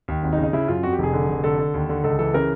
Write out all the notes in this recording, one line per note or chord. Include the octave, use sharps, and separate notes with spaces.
D#2
G#1
D#4
C#3
D#4
C#3 E4
F#2 F4
F2 F#4
G4
F1 G#4
D3
F1
D3 A4
D3
D#2
D3
C#2 A4
E3 A4
C#3 A#4